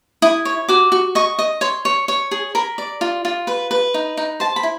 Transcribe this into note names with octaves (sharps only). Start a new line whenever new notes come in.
E4 D#6
C#5
F#4 D6
F#4
D#5 C#6
D#5
C#5 C6
C#5
C#5
G#4
A#4 B5
D5
F4
F4
B4 B5
B4
D#4
D#4
C5 A5
B5
E4